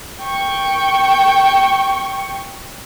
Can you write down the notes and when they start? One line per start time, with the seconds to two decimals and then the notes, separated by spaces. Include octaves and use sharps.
0.22 G5 C#6